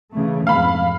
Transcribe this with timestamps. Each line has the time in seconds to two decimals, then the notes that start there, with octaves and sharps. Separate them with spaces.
0.11 C#3 E3 A3
0.47 F2 G#2 F5 B5